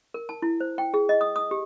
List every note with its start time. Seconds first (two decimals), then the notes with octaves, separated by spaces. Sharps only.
0.14 A#4
0.29 A5
0.42 E4
0.60 C5
0.78 G5
0.94 G#4
1.09 D#5
1.21 D#6
1.36 D#6
1.51 G4